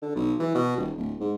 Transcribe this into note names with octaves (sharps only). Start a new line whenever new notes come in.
D3
B1
E3
B2
D#1
D1
G#2